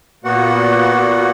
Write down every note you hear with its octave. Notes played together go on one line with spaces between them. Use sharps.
A#2 A#3 B3 F#4 F#5